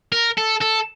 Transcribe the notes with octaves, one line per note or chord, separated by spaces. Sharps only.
A#4
A4
A4